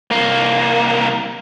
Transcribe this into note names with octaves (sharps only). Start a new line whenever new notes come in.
C2 A#3